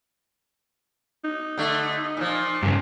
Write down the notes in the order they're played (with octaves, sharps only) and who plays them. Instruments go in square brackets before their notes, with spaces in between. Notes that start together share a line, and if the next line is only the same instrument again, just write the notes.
[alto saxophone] D#4
[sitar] D3 A3
A#2 F3
[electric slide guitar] G2 C#3